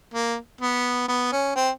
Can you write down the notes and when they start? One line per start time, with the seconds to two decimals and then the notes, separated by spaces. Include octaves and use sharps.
0.14 A#3
0.61 B3
1.08 B3
1.32 C#4
1.56 C4